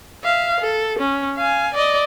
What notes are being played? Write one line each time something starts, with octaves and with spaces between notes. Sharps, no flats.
E5 F5
A4
C#4
F5 G#5
D5 D#5